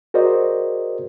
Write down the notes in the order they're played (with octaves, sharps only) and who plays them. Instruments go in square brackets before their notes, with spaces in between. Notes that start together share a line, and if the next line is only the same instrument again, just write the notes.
[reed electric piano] F#4 G#4 A#4 C5 D5 D#5